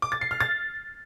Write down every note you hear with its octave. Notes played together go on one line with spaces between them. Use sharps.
D6
A6
C7
F6
A6